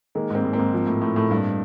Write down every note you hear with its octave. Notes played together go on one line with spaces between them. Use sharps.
D#3 G#3 A#3
G#2 A#3 C4
G#2
A#3 C4
G#2
F3
A2
A2
A2
G2